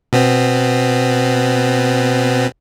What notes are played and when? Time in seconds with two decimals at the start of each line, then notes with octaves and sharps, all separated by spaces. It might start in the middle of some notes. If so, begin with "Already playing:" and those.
0.13 B2 B3 C4